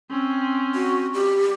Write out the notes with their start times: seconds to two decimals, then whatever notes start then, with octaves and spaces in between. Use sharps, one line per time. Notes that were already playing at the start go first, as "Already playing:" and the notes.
0.10 C4 C#4
0.75 F#4
1.14 G4